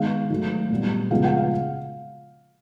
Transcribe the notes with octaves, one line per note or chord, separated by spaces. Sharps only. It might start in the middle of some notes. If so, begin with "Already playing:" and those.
Already playing: D#3 G#3 B3 F5
D#3 F#3 A3
A#2 G3 B3
C#3 F3 G#3 B3 F5
F#5
F5